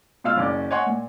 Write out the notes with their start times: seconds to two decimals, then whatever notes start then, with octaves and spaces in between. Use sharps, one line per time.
0.24 B2 F4 F5 E6 F6
0.36 F#1 C#4 D5 D6
0.71 C#5 D#5 F#5 G#5 C6 C#6
0.86 A#2